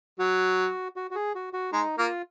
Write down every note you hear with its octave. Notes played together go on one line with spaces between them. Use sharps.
F#3 F#4
F#4
F#4
G#4
F#4
F#4
G#3 D#4
A#3 F4